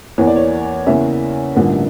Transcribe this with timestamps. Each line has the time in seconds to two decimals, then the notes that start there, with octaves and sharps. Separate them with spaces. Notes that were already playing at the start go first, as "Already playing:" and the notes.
0.18 E2 E3 A#3 C#5
0.27 D5
0.36 C#5
0.86 E2 C#3 E3 A#3 C#4 E5
1.55 A1 G2 D3 F3 A#3